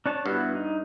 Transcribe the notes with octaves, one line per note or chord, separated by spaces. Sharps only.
D4 C#5 A5
G2 B3 E4 F#4
D#4